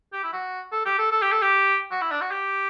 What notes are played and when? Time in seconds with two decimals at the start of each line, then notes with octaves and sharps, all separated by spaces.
0.13 G4
0.23 E4
0.33 F#4
0.72 A4
0.85 G4
0.99 A4
1.12 A4
1.22 G4
1.32 A4
1.42 G4
1.91 F#4
2.01 E4
2.11 D4
2.21 F#4
2.31 G4